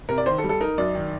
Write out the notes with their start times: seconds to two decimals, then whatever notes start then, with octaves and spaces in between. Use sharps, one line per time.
0.09 C3 A#4
0.18 D5
0.26 D#3 C5
0.38 A4
0.44 G3
0.49 A4
0.61 D#4 A#4
0.78 F#2 D5
0.95 D#3